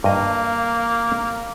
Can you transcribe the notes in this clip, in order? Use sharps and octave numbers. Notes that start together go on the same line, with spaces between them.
G2 A#3 D#5